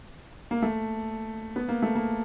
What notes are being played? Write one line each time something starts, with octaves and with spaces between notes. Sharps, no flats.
A#3
A3
B3
A#3
A3
A#3